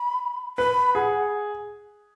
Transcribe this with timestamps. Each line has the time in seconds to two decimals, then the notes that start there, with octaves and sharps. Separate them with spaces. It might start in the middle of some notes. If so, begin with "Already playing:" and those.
Already playing: B5
0.58 B4 B5
0.95 G#4 F#5